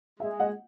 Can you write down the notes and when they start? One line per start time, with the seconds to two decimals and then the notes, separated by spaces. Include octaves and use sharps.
0.20 G#3 E5
0.40 D#5 F#5